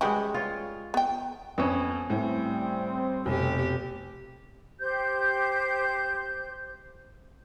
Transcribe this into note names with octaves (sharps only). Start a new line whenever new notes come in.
G3 G#3 C#4 F#4 B4 G5
F4 C#5
B3 G5
F2 B3 C#4
A2 G3 C4
F1 B2 G4
G4 C5 G6